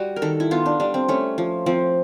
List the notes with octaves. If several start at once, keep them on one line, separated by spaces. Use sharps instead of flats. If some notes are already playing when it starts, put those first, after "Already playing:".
Already playing: G3 F#4
A#4
D#3 A4
E4
B3 F4
D4
G3 D4
C4
A3 C#4
F3
F3 C4